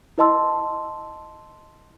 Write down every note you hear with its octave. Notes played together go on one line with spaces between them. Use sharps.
E4 B4 D#5 A5 C6 E6